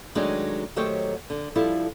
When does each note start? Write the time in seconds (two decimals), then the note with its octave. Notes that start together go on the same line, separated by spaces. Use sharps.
0.15 D#3 F#3 G#3 A3 D4 D#4
0.76 D#3 F#3 A3 G4 C5 C#5
1.30 D3
1.55 F3 G3 E4 A4